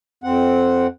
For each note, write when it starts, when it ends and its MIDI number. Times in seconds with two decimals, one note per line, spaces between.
0.24 0.87 41
0.24 0.87 60
0.24 0.87 78